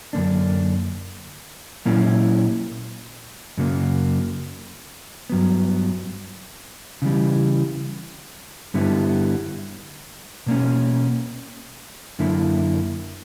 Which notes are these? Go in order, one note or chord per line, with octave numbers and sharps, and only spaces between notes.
F#2 D3 A#3 D4
A#2 F#3 A#3 C#4 E4
F#2 C#3 F#3 A#3
G2 F#3 B3
C#3 E3 G3
G2 D3 G3 B3 E4
B2 A#3 C#4
F#2 D3 A#3 E4